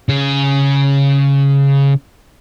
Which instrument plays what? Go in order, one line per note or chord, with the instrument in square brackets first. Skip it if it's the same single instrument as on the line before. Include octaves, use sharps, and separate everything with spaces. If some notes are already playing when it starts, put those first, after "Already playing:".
[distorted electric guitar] C#3 G#4